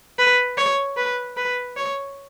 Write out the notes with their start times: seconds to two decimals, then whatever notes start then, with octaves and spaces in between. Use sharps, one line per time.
0.19 B4
0.58 C#5
0.97 B4
1.37 B4
1.77 C#5